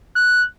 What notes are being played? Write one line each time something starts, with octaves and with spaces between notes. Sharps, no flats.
F#6